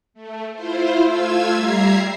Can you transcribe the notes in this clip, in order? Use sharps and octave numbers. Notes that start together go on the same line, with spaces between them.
A3
E4 F4 C5
A3 F4 F5 E6 G#6
G3 E5 A#5 G#6 C7